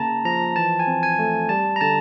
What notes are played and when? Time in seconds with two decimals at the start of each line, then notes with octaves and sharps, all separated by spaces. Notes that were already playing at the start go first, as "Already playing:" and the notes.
Already playing: C#3 A#3 A5 A#5
0.25 F3 A#5
0.56 E3 A5
0.79 G#5
0.87 C4
1.03 G#5
1.19 A3
1.49 G3 A5
1.76 A#5
1.81 D3 A5